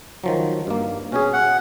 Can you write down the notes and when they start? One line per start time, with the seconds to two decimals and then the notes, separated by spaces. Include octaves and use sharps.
0.24 D#3 F3 F#3
0.67 G2 A#3
1.12 B2 C#4 G#4
1.33 F#5